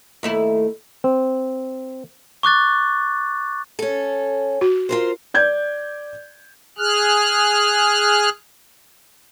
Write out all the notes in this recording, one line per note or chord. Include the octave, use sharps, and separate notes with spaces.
D#2 A3 E4
C4
C#6 D6 F#6 A6
C#4 A4
F#4
F4 A#4 C5
D5 G6 G#6
G#4 F6 F#6